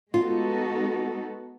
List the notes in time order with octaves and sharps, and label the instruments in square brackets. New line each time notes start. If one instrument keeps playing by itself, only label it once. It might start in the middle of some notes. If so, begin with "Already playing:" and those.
[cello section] G#3 B3 D#4 F#4 A4 [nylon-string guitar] F4